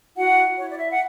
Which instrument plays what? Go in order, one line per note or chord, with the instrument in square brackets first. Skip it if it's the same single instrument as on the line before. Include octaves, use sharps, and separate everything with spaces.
[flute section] E4 F#4 F#5
E4 C#5
D5
E5
F#5